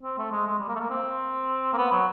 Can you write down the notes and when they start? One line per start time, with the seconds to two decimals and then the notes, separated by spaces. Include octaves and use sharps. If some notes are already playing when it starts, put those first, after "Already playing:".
0.03 C4
0.18 A3
0.32 G#3
0.47 G#3
0.58 G3
0.68 A#3
0.76 A3
0.80 A#3
0.90 C4
1.73 A#3
1.78 B3
1.92 F#3